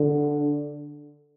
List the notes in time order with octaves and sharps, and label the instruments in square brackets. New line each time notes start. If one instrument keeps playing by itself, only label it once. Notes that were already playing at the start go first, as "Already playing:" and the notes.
Already playing: [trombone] D3